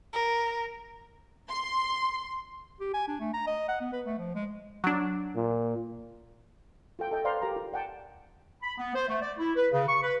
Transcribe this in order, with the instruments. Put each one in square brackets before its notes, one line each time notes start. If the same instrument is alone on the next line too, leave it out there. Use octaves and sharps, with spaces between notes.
[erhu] A#4
[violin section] C6
[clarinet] G4
G#5
D4
A3
A#5
D#5
F#5
B3
B4
A3
F3
G#3
[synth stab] F#3 D4
[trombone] A#2
[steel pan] F4 A4 G5
A4 D#5 G5
B4 C5 D5 F5 A#5 C6
G4 A#4 F5 A#5
F4
D5 F#5 G5 A5
[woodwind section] B5
B3
C5
A3
D5
E4
B4
C#3
C#6
B4